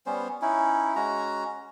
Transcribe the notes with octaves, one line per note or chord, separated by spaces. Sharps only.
G3 B3 C#4 C5
C#4 D#4 E4
G#3 C#4 F#4 A#5